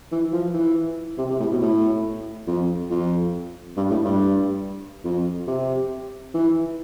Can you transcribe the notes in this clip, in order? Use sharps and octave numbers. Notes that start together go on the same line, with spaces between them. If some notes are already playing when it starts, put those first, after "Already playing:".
E3
F3
E3
C3
C3
A2
B2
A2
F2
F2
G2
A2
G2
F2
C3
E3